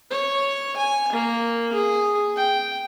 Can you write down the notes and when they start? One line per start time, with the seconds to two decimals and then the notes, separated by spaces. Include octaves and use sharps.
0.10 C#5
0.77 G#5
1.12 A#3
1.73 G#4
2.36 G5